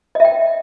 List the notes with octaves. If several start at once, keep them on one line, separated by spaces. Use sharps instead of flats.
D#5 E5 G5